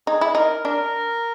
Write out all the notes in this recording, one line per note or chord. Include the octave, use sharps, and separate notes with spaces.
D#4 G#4
E4
D#4 A#4
D4 A#4